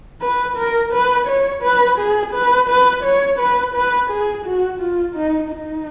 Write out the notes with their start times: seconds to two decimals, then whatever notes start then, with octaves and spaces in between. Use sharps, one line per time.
0.21 B4
0.57 A#4
0.92 B4
1.27 C#5
1.62 B4
1.98 G#4
2.33 B4
2.69 B4
3.03 C#5
3.38 B4
3.74 B4
4.10 G#4
4.45 F#4
4.80 F4
5.15 D#4
5.51 D#4